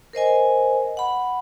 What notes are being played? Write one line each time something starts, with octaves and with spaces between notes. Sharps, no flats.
A#4 C5 D#5 G#5
F#5 B5